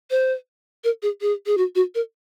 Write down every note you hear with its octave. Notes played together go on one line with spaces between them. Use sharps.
C5
A#4
G#4
G#4
G#4
F#4
F#4
A#4